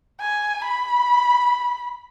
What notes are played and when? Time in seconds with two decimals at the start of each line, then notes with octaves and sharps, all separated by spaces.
0.20 G#5
0.65 B5